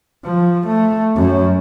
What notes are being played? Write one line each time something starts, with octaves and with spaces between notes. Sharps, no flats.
F3
A3
F#2